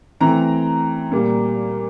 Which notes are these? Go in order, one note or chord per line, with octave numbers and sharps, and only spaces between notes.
E3 A3 C4 A#5
A#2 G3 A#3